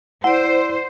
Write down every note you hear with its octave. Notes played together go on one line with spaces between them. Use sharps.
E4 C5 D5 F#5